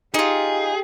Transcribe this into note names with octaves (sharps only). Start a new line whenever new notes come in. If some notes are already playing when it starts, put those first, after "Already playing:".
D#4 F4 G4 G#4